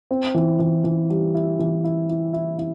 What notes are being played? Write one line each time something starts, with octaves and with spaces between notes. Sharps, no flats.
C4
E3
E3
E3
G3
E4
E3
E4
E4
E4
E4